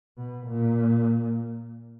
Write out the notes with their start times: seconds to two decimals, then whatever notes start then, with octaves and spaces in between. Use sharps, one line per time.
0.18 B2
0.47 A#2